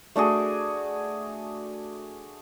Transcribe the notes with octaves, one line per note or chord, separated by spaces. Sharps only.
A3 D4 F#4 G#4